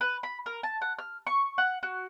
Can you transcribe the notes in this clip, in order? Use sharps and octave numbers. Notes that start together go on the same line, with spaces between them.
B4
B5
A#4
A5
F#5
F6
C#6
F#5
F#4